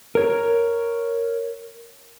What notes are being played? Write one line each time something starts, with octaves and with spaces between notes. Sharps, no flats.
A#4 C#5